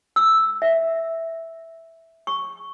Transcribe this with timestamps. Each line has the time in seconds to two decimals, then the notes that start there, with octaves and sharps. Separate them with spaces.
0.16 E6
0.62 E5
2.27 C#6